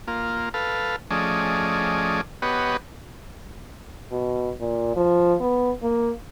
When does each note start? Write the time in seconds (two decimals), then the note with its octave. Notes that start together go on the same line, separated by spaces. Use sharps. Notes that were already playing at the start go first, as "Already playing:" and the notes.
0.08 A#3 F4
0.54 A4 B4 F5
1.11 F3 A3 C#4 G#4 D5 D#5
2.42 B3 G4 B4 C#5 D#5 F#5
4.11 B2
4.60 A#2
4.96 F3
5.40 B3
5.82 A#3